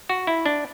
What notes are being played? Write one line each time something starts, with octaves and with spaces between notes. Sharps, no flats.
F#4
E4
D4